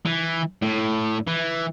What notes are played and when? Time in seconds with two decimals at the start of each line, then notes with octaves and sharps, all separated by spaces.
0.06 E3
0.62 A2
1.27 E3